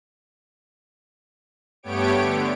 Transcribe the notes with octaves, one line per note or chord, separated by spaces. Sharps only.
G2 A3 B3 G4 C#5 D7
D3